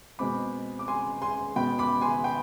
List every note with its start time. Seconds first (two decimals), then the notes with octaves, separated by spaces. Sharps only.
0.19 B2 G#3 C4 B5 D6
0.79 D6
0.88 G#5 C6
1.22 G#5 C6
1.56 B2 G#3 B3 G5 B5
1.79 B5 D6
2.01 G#5 C6
2.24 G5 B5